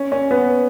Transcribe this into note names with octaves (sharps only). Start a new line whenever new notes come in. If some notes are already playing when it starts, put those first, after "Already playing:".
Already playing: C#4
C#4
B3